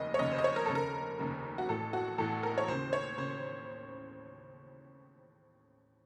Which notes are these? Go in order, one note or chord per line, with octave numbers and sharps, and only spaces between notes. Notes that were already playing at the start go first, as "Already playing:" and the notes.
Already playing: F1 D#2 C#3 D#5
C#5
F1 D#2 C#3 D#5
C5
D#5
C#5
A#4
F1 D#2 C#3 A4
A#4
F1 D#2 C#3
F#4
A1 A2 A4
F#4
A1 A2 A4
A#4
C#5
D#2 C#3 C5
C#5
C#3 C5